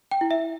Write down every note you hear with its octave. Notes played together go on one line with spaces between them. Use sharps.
G5
E4
E5